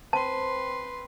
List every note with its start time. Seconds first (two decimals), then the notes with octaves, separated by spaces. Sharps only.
0.13 C4 B4 A5 C6